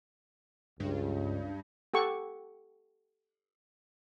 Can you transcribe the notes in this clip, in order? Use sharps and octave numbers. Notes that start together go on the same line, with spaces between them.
C#2 G2
G4 A4 F#5 C#6